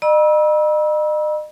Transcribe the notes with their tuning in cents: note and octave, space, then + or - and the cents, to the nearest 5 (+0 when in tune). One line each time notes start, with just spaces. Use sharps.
D#5 -40 B5 -45 E6 -20